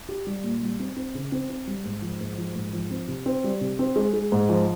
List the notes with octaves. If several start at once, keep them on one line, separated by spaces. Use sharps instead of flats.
G4
G3
A#2
G3
C4
C4
C#3
C4
C4
G3
G#2
F3
G#2
F3
G#2
F3
C4
C3
C4
G3
C3
C4
G#3
G#3
G#2
F3